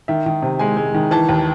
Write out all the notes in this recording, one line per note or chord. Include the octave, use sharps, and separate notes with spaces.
D#3 E5
D#3
C3
G#3 G#5
G#3
D#3
E3 A5
D#2